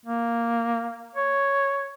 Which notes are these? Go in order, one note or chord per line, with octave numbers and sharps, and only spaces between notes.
A#3
C#5